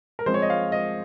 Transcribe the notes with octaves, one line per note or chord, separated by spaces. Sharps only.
A#4
F3 G#3 C4 C5
C#5
D#5
F5
D#5